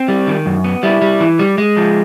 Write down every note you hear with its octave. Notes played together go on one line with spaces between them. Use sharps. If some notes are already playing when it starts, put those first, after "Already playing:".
Already playing: C4
G3
D#3
F#2
B3
G3 E4
G3
E3
G3
G#3
F3